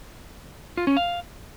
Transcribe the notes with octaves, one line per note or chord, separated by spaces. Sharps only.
F4
C#4
F5